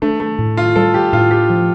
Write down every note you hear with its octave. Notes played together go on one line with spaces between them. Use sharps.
A3 D4
A3
A2
F4
G3 A4
G4
A2 F4
G4
F3